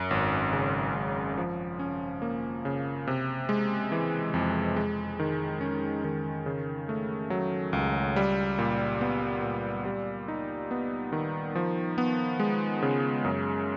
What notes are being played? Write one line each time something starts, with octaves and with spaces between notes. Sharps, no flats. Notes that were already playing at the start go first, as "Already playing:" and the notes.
Already playing: F#2
G#1
C#3
G#1
F3
C#4
A#3
C#3
C3
G#3
E3
F2
G#3
D#3
C#4
D#3
C#3
A3
F#3
C#2
G3
A#2
B3
A#2
G3
D#4
B3
D#3
F3
B3
G#3
C#3
F#2